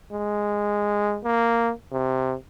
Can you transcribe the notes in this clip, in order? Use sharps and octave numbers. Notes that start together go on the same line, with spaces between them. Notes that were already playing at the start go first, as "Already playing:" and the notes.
G#3
A#3
C3